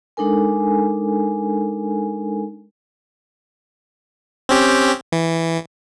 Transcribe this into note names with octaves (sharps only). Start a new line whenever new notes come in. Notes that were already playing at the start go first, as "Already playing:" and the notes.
G#3 D4 D#4 A4 A#4 G#5
C4 C#4 G4
E3